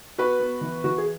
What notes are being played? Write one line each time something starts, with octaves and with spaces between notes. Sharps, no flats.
B3 F#4 B4
B3
E3
E3 F#4
G#4